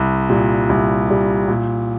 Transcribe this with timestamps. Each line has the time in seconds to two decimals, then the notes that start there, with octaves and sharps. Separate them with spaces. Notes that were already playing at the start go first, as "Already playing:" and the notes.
Already playing: C2
0.29 A#2 G3
0.69 C2
1.09 A#2 G3
1.48 A#2